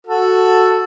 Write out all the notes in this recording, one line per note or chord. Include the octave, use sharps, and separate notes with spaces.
F#4 A4